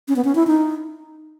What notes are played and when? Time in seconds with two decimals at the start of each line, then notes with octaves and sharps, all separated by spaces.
0.08 C#4
0.16 B3
0.25 C#4
0.35 E4
0.47 D#4